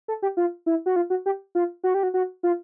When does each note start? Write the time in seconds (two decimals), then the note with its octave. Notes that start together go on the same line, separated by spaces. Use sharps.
0.08 A4
0.22 G4
0.37 F4
0.66 E4
0.86 F#4
0.96 F4
1.10 F#4
1.26 G4
1.55 F4
1.84 F#4
1.94 G4
2.03 F#4
2.14 F#4
2.43 F4